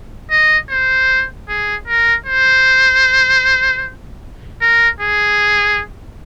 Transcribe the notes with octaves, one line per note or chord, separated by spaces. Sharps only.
D#5
C5
G#4
A#4
C5
A#4
G#4